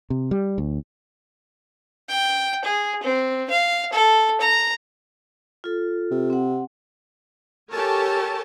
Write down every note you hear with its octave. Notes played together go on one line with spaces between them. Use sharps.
C3
G3
D2
G5
G#4
C4
F5
A4
A#5
F4 A4
C3
C4 F#5
G4 A4 A#4 C#5 G#5 A5